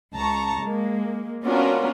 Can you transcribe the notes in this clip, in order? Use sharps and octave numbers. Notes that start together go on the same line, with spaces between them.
C#2 A5 A#5 C#6
G#3 A#3
B3 C#4 D4 F4 F#4 A#4